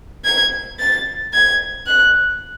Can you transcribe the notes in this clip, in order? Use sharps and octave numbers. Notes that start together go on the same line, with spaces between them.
G#6
A6
G#6
F#6